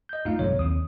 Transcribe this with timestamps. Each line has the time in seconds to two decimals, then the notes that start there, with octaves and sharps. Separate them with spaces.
0.09 D#5 G6
0.25 G2 A3 D#4 F4 F5
0.39 B1 G2 C3 F#3 C#5
0.59 D#2 C4 D#6